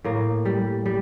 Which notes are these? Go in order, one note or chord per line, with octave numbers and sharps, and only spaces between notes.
A2 A#3
G3
G3